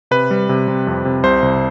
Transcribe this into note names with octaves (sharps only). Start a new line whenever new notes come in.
C3 B4
G3
C3
C3
F2
C3
C2 C5
C2